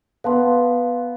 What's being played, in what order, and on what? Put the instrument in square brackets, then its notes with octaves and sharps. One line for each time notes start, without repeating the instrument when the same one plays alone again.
[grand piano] B3 [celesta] F5 A5 C6